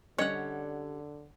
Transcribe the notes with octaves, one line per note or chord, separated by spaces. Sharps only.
D3 G3 C#4 C#5 D#5 F#5